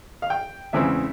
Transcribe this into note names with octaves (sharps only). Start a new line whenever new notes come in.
F5
G5
E2 C#3 E3 G#3 C4 E5